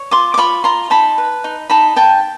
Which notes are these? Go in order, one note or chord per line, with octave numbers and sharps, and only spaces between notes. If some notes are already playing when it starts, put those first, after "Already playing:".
Already playing: C#5
F4 C6 D6
D6
F4 B5 C#6
F4 A#5 C6
D#4 A5 B5
B4
D#4
D#4 A5 B5
D#4 G5 A5